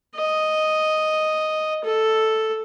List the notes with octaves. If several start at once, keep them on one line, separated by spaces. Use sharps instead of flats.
D#5
A4